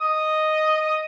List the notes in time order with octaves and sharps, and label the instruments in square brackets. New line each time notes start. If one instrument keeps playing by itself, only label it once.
[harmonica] D#5 D#6